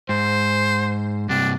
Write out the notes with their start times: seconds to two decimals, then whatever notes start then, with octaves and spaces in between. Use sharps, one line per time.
0.09 G#2 C5
1.29 G2 C3 D4